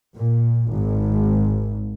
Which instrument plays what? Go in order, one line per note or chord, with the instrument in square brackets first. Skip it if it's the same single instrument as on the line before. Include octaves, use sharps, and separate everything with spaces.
[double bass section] A#2
G#1